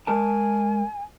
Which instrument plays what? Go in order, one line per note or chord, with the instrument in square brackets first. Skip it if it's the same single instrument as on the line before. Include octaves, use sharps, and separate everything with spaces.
[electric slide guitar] G#3 A#4 A5 [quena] G#5